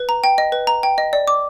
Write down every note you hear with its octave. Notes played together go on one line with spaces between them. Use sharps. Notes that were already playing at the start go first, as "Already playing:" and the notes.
Already playing: B4
A#5
G5
D#5
B4
A#5
G5
D#5
D5
D6